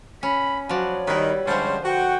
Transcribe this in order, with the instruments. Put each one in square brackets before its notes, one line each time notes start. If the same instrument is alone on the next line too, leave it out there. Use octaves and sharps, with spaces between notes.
[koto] C#4 [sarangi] B5
[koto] F3 D5 [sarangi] F#3 [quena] C#5
[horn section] D#3 [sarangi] G3 [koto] E4 B4
[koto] D3 F3 [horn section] G3 G#3 C#4 [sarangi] C5
[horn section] F#4 [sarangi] G5